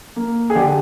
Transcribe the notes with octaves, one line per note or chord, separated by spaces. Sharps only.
A#3
G#4
D3 G4